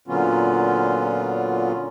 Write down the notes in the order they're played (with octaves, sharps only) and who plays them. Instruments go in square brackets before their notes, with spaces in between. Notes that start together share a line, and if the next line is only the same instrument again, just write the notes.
[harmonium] A#2 D3 F#3 B3 C#4 F4